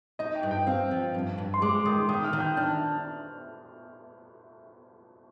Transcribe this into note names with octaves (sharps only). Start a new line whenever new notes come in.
D#4 D#5
G5
G2
G5
C4 F5
F3
G2
G2
C6
G#3 D6
D#3 D#6
D#3 D#6
F6
D#3
G6
D4 F6